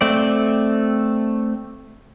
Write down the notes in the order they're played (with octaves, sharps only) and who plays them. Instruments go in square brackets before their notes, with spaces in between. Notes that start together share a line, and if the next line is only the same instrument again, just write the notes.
[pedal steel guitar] A3 C4 D5